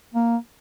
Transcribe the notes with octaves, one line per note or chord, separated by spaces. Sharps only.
A#3